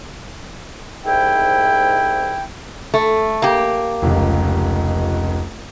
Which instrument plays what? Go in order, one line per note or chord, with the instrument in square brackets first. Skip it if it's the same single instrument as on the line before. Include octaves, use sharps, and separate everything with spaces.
[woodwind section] C2 G#2 E4 G5
[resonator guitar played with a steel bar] A3
A#3 G4
[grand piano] F1 C#2